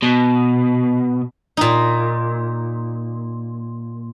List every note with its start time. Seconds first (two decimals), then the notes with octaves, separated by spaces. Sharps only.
0.03 B2
1.57 A#2 D#4